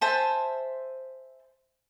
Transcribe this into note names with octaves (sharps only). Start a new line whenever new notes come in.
C5 E5 G#5 A5